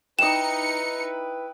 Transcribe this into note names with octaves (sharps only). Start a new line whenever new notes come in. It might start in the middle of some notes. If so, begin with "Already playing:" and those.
D#4 E4 B4 G5 D#6 C#7 E7